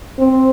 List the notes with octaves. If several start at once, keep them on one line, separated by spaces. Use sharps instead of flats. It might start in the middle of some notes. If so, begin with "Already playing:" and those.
C4